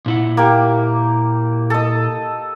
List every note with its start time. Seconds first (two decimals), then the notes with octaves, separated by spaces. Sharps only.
0.06 A#2 E4 F#5
0.37 A#3 G4
1.70 A4 D#5